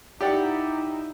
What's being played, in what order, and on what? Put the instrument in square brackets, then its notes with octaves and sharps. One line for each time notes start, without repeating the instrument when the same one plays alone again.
[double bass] D#4 E4 [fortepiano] G4 D5 F#5